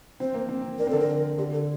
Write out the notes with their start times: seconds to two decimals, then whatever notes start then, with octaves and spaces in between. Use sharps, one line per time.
0.20 C4 C5
0.34 A#3
0.49 C4
0.79 D4 A#4
0.87 C4
0.90 D3 D4 A4
1.00 A#4
1.38 D3 D4 G4
1.53 A4